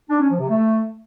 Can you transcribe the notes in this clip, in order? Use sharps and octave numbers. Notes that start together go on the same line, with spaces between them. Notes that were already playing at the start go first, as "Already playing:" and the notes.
D4
C#4
F3
C3
A3